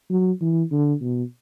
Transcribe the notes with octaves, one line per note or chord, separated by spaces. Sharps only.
F#3
E3
D3
B2